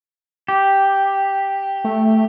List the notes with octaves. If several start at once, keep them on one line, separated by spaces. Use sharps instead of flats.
G4
A3